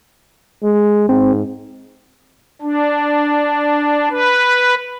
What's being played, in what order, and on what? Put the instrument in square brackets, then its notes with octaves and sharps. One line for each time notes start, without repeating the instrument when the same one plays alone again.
[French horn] G#3
[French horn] G#2 [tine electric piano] C4
[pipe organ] D4
B4